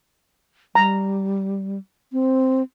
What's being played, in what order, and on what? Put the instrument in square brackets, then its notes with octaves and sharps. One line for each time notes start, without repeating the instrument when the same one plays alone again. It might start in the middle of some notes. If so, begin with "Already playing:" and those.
[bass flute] G3 [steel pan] A#5
[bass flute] C4